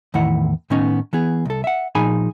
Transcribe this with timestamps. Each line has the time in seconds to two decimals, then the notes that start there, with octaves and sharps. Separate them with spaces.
0.14 E2 A2 D#3 E4 F#5
0.70 A2 D#3 A3 B3 C#4 D#4
1.13 E3 B3 G#4
1.45 C2 A4
1.64 E5 F#5
1.95 A#2 F3 D#4 G#4 G#5 B5